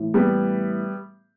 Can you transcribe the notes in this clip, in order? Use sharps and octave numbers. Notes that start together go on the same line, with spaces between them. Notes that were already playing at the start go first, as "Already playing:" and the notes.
Already playing: A2 E3
G3 B3